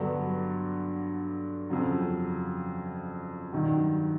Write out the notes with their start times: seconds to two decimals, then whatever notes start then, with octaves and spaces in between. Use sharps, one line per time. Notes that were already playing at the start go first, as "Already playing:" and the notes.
Already playing: G2 D3 F#3 B3 D4
1.70 F2 C#3 F#3
3.52 G2 D#3 F#3